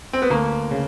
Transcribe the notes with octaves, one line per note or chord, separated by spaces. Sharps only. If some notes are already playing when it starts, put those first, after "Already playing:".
C4
B3
D2 A#3
C#3